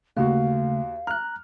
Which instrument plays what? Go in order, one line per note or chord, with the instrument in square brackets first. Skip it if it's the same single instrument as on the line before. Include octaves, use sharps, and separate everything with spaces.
[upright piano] D#2 F#4 [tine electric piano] C#3 A3 [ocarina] F5
[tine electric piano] A#5 F#6 [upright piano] F6